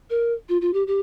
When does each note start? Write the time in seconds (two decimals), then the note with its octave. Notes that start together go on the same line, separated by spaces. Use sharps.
0.10 A#4
0.49 F4
0.61 F4
0.73 G4
0.87 G4